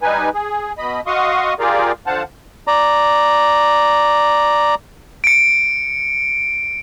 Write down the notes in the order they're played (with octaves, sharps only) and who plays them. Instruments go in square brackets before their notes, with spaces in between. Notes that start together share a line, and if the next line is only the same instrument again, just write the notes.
[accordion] G3 D#4 B4 G#5
G#4
B2 D#5 B5
F#4 D#5 F5 C6 C#6 D#6
F4 G4 G#4 A#4 D5 F5
D3 F3 C5 F5 F#5 A5
[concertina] D5 A#5
[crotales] C#7 D7